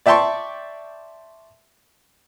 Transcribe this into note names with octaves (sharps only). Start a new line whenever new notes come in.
D5 E5 G5 A5 C6 C#6